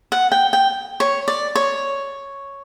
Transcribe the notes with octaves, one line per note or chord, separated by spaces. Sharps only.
F#5
G5
G5
C#5
D5
C#5